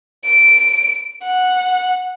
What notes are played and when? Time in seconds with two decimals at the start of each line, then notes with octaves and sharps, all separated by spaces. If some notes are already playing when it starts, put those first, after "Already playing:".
0.25 D7
1.22 F#5